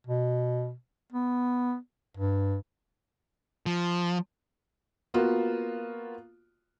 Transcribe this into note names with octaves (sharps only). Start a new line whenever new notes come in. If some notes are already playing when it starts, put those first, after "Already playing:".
B2
B3
G2
F3
A#3 B3 F4 F#4